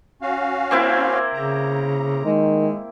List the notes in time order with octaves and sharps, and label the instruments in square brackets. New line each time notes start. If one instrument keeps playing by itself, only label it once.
[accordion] C#4 F#4 F5
[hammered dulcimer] A#3 C4 E4 [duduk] C5
[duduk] C#3 [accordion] A#5
[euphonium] D#3 [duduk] G#3